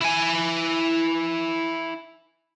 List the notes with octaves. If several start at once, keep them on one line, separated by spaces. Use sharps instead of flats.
E4 G#5